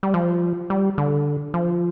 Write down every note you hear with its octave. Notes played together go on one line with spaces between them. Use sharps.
G3
F3
G3
D3
F3